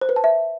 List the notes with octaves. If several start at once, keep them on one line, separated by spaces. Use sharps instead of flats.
C5
B4
A5
E5